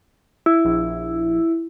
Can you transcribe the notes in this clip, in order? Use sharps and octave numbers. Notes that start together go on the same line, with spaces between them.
E4
A#1